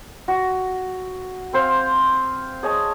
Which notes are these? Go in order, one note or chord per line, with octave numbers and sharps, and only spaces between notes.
F#4
C4 C5 F5
G#4 C#5 D#5 A5